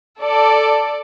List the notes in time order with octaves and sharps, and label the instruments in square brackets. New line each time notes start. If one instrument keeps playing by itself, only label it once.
[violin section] A4 D5